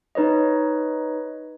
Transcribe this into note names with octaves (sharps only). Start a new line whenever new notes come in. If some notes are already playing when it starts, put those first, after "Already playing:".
D#4 B4 C#5 D#5